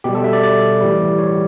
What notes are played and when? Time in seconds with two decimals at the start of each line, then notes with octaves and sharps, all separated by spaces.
0.04 B2 G3 G4
0.15 A4
0.24 E5
0.33 D5
0.43 D5
0.81 A2 E3 G3
1.19 C#5